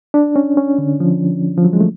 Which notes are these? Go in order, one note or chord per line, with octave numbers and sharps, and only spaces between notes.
D4
C#4
C#4
D3
F3
F3
F#3
G#3
A3